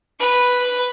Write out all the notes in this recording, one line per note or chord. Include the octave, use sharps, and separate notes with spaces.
B4